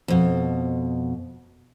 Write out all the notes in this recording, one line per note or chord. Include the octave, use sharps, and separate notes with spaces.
F2 B2